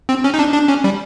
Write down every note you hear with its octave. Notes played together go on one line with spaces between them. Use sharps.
C4
C#4
D#4
D4
D4
C#4
G3